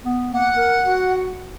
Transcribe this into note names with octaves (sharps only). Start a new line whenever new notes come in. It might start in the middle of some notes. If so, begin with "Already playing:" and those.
B3
A#3 F#5
A#4
F#4